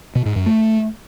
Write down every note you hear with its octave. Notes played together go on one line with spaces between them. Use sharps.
B2
G#2
F#2
A3